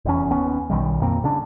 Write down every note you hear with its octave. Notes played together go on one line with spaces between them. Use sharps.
F1 E2 C#4
D#2 B3 C#4
B1 D#3 G3
F2 A#2 A#3 C4
C#3 D4